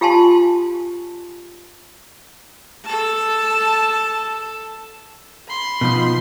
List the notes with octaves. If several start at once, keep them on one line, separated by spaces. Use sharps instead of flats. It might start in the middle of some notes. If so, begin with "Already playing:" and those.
F4 G4 F5 G#5 A5 C6
A4 A5
B5 C6
B2 F3 D#4